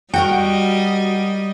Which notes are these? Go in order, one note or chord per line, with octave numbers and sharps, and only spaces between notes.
G3 F#4 A#4 D#5 F#5 G5